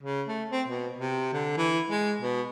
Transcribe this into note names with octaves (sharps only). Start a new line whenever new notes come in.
C#3
A3
C4
B2
C3
D3
E3
G#3
B2